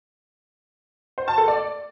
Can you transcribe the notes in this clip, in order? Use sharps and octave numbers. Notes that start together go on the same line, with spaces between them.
C5
A5
A4
D5